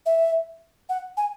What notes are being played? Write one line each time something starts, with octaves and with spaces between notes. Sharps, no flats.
E5
F#5
G#5